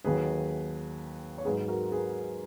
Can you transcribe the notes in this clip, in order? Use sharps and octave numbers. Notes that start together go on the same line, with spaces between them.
D#2 D#3 F#3 G#4 B4
C#5
G#2 F#3 G#4 B4
F#4 A#4
G#4 B4